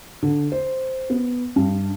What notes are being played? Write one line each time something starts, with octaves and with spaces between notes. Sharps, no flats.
D3
C5
B3
G2